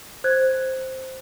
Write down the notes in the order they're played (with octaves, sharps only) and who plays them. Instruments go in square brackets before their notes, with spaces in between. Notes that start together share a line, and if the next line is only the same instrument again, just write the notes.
[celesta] C5 F#6 G#6